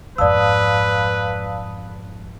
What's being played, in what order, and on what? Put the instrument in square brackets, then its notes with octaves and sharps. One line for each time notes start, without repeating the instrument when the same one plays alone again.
[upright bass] F2 G#2 [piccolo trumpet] B4 [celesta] D5 E6 [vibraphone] F5 A5 D#6